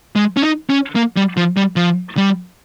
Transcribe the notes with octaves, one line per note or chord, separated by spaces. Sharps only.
G#3
C#4
D#4
C#4
A#3
G3
F3
G3
F3
G3